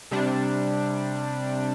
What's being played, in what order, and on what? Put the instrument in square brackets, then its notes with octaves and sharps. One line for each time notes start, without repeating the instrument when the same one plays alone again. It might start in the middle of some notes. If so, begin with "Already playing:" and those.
[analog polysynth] C3 G3 D4